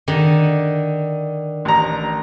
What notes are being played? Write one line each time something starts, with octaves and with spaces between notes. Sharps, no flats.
D3 D#3
A1 A#5